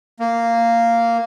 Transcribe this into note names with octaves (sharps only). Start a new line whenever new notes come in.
A#3